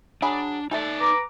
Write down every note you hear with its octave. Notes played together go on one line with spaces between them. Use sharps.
F#3 D4 G#4 B5
A3 D#4 A4 D5 E5
B4 A#5 D6